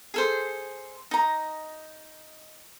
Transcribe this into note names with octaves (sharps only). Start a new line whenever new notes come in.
G#4 A4 C5
D#4 A#5